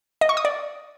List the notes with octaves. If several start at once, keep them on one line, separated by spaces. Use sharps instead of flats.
D#5
C#6
D#6
D5